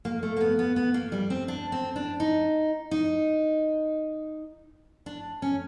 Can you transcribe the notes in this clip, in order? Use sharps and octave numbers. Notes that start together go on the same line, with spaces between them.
A#3
A3
A#3
B3
B3
B3
A#3
G3
C4
D4
C4
D4
D#4
D#4
D4
C#4